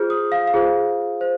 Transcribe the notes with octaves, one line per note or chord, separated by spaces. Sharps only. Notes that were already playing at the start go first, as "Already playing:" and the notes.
Already playing: F4 G#4 C5 F6 G6
D#6
F5
F5
F4 G#4 C5
C5